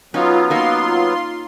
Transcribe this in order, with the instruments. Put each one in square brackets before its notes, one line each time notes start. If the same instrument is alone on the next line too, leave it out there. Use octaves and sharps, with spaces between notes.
[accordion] F#3 B3 [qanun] C#4 D#4 [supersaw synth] F4
[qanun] A#3 D#4 A#4 [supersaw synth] F4 C6